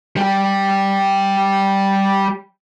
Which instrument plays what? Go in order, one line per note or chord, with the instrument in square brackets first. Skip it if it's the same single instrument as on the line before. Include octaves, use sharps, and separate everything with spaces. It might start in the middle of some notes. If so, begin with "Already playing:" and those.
[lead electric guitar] G3 G4